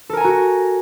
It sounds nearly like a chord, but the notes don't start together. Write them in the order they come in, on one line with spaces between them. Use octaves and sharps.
A4 A#4 G#5 A#5 F#4